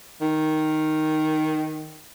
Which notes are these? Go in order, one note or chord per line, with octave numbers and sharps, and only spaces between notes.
D#3